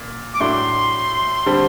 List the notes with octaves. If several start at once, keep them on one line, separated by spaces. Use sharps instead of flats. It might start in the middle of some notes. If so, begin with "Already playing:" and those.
Already playing: A#2
D6
A2 F#3 A3 D4 C6
D3 G3 C4